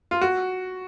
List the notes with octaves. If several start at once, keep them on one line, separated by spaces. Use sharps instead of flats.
F4
F#4